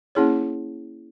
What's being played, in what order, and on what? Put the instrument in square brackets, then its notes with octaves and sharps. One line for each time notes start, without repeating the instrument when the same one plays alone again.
[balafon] A#3 C#4 E4 G#4 C#5